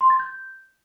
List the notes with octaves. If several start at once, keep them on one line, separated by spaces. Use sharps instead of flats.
C6
A6
G6